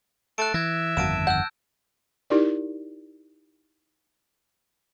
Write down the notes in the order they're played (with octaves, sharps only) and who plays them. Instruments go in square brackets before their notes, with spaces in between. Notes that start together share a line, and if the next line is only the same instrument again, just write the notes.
[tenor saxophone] A3 [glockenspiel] F#6 A6 D7
[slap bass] E3 [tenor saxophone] E5 [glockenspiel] G#6 A#6
[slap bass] G1 F2 D#3 [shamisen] A#3 F#4 [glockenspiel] A5 D7 E7
[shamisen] F#5 [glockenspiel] E6 F#6 G6
[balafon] D#4 E4 G4 A#4 D5